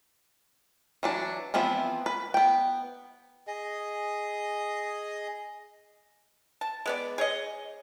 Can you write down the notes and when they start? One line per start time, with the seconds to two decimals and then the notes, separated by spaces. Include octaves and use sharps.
1.03 E3 F#3 D4
1.54 E3 F3 B3 C4 E4
2.06 B4
2.34 B3 G5
3.47 G#4 D#5
6.61 A5
6.86 G#3 B3 D5
7.18 G#4 C#5 D#5